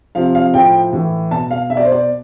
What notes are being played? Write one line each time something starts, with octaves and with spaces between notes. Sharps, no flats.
C3 F3 F5
F5
A2 F3 G5
A2 E3
B2 A5
F5
B2 E5
D5
C5
D5